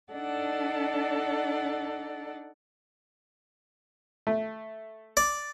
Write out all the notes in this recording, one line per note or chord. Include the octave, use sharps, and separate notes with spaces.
D4 D#4 A4 D5 F#5
A3
D5